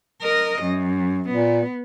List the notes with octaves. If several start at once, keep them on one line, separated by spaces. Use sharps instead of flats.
A#4 D#5
F#2
A#2 B3